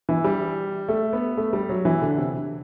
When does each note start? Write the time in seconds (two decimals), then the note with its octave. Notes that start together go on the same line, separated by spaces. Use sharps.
0.09 E3
0.24 G3
0.88 A3
1.13 B3
1.37 A3
1.53 G3
1.69 F#3
1.85 E3
2.01 D3
2.18 C3